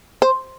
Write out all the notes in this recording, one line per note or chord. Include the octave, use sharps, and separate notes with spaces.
C5